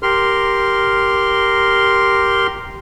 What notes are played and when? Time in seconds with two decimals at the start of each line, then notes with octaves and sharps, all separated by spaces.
0.03 G4 A#4 C6 F6